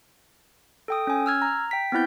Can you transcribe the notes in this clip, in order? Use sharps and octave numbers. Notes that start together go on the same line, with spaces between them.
A4 G5 D#6
C#4 G#5
E6 F6 G#6
A#5
G5 B6
B3 C4 E4 G6